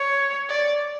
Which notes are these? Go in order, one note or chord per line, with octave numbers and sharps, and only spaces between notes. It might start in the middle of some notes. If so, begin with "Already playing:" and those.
Already playing: C#5
D5